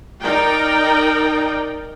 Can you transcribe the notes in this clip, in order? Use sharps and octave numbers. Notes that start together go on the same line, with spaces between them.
D#4 A#4 D5 G5